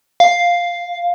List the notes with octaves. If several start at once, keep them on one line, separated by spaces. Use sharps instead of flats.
F5